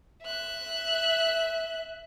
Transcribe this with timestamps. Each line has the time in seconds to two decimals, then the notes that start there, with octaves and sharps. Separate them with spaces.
0.22 E5 F#6